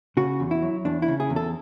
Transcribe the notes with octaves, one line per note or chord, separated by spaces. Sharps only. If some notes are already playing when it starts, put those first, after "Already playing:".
C#3 F#4
E2
E4
F#3
E2 D4
E4
C#3
G#4
E2
A4